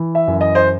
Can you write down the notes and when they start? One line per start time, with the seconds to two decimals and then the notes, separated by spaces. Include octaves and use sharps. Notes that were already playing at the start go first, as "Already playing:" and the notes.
Already playing: E3
0.15 E5
0.28 F#2
0.41 D#5
0.55 C5